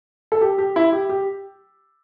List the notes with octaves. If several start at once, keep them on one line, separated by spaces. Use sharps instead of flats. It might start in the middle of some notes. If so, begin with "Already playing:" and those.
A4
G4
G4
E4
G4
G4